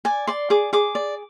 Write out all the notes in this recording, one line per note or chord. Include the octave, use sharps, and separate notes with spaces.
D5 G#5
D5 C6
G#4 D6
G#4 D6
D5